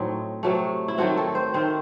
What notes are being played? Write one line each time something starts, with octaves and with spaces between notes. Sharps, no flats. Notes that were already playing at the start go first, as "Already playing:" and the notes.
Already playing: A2 F#3 A3 C4 D#4
C3 F#3 A3
E4
D#3 F#3 A3 C4 F#4
A4
C5
D#3 A3 C4 C5